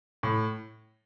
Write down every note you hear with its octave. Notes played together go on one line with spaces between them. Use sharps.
A2